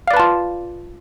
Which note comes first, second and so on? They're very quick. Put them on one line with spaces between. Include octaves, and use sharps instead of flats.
F5 D5 B4 A5 F4